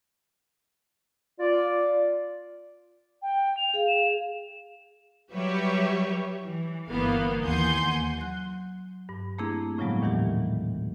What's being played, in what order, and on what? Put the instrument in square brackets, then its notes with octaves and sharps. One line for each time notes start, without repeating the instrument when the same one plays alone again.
[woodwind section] F4 D5
[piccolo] G5
F7
[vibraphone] G#4 F5
[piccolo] E7
[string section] F#3 G3 G4 B4 C#5 E5
E3
G1 E3 A#3 B3 F5
D#2 E3 F#5 G#5 C6 G6
[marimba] F#3 F#6
G2
A3 A#3 C4 D4 E4 G#4
A2 C#3 F3 F#3 G#3 B3
D#2 A#2 D#3 E3 F#3 G4